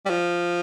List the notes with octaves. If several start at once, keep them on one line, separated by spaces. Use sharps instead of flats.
G3
F3